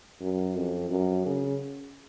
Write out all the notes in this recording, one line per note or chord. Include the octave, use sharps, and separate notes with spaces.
F#2
F2
F#2
C#3